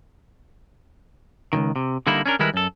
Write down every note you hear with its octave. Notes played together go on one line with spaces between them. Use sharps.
C#2 G#2 D#3
C3
D3 G3 A#3 D#4 E4
C#4 D4 A#4
D#3 G3 G#3 E4 A#4 B4
F#2 A4